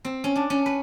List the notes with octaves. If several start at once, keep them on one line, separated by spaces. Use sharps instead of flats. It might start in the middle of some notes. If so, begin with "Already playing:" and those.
C4
C#4
D4
C#4
B4